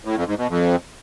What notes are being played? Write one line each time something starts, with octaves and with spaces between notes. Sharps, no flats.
A2
F2
G#2
B2
F2